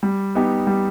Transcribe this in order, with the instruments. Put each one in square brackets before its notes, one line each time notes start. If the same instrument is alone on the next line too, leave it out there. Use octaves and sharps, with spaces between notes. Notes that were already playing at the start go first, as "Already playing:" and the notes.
[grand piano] G3
B3 D#4 G4
G3